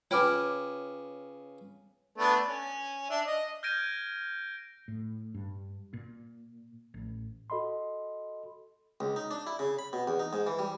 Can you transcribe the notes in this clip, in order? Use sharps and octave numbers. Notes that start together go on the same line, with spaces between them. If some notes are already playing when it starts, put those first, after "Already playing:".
C#3 F4 B4 C#5 G5 D6 F6
A3 B3 D4
C#4
D4 E5
D#5
F6 G6 G#6 A#6 D7 D#7
A2
G2
A#2
A1
F#4 A4 D#5 B5 C6
C#2
D#4
D4
E4
C#3
B5
B2
E2
D#4
G#2
E3
G3